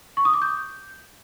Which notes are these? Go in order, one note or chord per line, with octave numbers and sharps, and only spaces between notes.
C#6
D#6
D6
G6